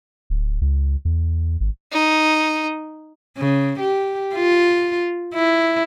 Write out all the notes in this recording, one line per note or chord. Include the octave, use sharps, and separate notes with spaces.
D1
C#2
E2
G#1
D#4
C#3
G4
F4
E4